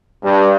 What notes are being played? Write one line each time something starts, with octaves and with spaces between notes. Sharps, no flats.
G2